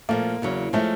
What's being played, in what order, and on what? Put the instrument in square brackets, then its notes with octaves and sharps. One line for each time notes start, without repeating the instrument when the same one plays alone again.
[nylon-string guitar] A#2 F3 A3 [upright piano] A#3
[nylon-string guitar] E2 C#3 F#3
[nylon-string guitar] F3 G#3 C#4 [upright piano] A3